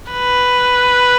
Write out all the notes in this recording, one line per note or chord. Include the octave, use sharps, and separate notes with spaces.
B4